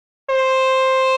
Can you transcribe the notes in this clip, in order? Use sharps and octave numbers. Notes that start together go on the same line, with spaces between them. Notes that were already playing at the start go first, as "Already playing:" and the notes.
C5